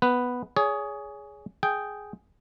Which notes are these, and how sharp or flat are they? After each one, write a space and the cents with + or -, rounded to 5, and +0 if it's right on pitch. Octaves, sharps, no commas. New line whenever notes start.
B3 +0 B4 +5
G#4 +0 C#5 +35
G#4 +0 G5 -5